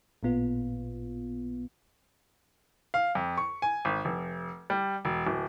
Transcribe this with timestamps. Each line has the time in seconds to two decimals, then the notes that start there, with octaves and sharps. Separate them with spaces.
0.23 A1 A#2 B3 F4
2.94 F5
3.15 F2
3.37 C#6
3.62 G#5
3.85 G#1
4.05 F1
4.70 G3
5.05 E1
5.27 D1